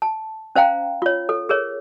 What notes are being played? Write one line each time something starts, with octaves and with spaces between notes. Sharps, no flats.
A5
C#4 C5 F5 G5 A#5
F4 C#5
A4
G#4 A#4 C#5